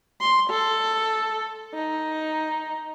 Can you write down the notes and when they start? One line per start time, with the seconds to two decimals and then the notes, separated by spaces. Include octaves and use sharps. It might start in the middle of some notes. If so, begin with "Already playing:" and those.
0.21 C6
0.50 A4
1.74 D#4